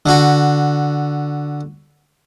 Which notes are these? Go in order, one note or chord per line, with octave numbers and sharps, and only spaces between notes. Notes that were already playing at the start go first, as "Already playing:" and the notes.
D3 F#4